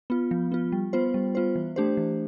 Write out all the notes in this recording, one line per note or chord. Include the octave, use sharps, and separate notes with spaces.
B3 F4
F3
B3 F4
G3
B3 F4 C5
G3
B3 F4 C5
E3
A3 D4 G4 C5
E3